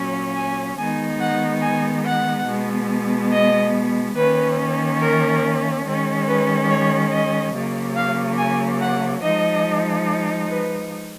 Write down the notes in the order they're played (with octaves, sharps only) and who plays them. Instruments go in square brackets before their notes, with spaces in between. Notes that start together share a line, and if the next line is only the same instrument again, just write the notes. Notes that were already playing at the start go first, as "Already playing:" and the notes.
Already playing: [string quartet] A#2 F#3 C#4
G#5
D#3 G#3 B3 D#4 G#5
F#5
G#5
F#5
B2 G#3 B3
D#5
D#3 A#3 C#4 B4
A#4
D#3 G#3 C#4
B4
C#5
D#5
C#3 F#3 A#3
F5
G#5
F#5
F3 G#3 D#4 D#5
B4